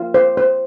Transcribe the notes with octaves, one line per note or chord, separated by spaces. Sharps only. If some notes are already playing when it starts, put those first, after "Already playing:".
Already playing: F4
C5
C5